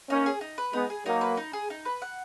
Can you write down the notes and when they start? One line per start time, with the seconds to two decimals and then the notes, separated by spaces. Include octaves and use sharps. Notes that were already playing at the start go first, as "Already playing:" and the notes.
0.10 A#3 C#4 D#4
0.26 G#4
0.41 D#4
0.58 B4
0.73 G#3 B3 D#4
0.90 G#4
1.06 F#3 A#3 D#4
1.21 B4
1.37 D#4
1.53 G#4
1.70 D#4
1.85 B4
2.02 F#5